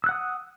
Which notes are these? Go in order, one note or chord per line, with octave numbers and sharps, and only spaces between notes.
F#5 D#6 E6 F#6